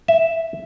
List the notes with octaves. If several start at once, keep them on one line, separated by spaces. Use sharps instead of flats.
E5